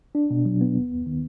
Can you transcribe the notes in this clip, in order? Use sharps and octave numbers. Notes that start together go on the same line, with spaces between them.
D4
B2
F#3
B3
D#2
D#2
D#3